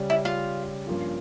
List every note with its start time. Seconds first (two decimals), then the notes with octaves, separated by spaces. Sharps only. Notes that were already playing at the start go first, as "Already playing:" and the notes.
Already playing: C#3 G3 C#4 G4 D5
0.10 E4
0.25 F4
0.87 G2 F3 A#3 C#4 F4